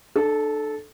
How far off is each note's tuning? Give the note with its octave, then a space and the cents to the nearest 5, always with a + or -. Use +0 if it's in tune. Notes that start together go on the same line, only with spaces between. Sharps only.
D4 +40 A4 -15